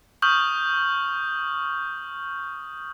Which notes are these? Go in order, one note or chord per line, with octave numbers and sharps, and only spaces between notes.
C#6 D#6 F6 G6 F#7